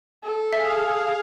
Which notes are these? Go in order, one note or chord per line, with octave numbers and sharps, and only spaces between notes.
A4
G#4 E5 F5